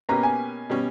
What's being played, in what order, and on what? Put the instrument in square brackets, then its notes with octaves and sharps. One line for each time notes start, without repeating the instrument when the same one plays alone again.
[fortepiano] B2 A#3 C#4 G4 B4 [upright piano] A#5
[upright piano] G#5
[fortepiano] B2 G3 C#4